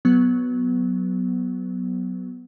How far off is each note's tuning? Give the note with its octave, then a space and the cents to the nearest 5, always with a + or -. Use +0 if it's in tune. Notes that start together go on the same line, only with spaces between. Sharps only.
F#3 +0 B3 +0